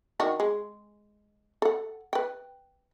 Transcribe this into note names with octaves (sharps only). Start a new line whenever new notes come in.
D#3 D4 F#4
G#3
A4 F#5
B4 G5